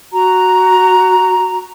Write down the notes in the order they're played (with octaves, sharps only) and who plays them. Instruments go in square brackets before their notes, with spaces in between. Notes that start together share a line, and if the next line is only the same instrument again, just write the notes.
[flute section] F#4 A#5